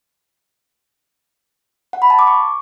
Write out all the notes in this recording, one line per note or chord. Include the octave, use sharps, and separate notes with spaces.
F#5
B5
A5
D6
C#6